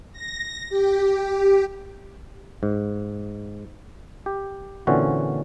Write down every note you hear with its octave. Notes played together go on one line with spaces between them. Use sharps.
A#6
G4
G#2
G4
A#2 D3 E3 C4 C#4 F#4